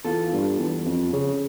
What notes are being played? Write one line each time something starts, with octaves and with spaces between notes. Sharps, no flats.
E2 F4 A4
G2
E2
F2
C#3